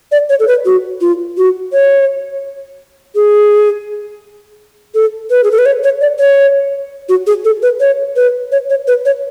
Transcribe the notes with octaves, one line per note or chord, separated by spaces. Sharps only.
D5
C#5
A4
B4
F#4
F4
F#4
C#5
G#4
A4
B4
G#4
A4
B4
C#5
C#5
D5
C#5
F#4
G#4
A4
B4
C#5
B4
C#5
C#5
B4
C#5